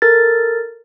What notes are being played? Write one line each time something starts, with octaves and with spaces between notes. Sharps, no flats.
A4 A#4 A6